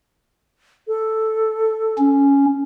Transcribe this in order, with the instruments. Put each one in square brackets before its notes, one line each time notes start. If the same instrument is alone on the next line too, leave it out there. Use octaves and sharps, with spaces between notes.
[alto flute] A4
[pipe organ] C#4